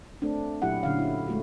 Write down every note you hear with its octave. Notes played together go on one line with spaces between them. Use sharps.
A3 C4 D4
A#2 F#3 E4 G4 F#5
A#2 D3 C#4 F5
E4 F#4
G#3 A3 F#4